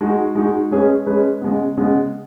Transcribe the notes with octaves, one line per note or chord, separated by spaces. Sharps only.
G#3 D#4 F#4
G#3 D#4 F#4
G#3 C#4 G#4 B4
G#3 C#4 G#4 B4
C#3 G#3 B3
C#3 G#3 B3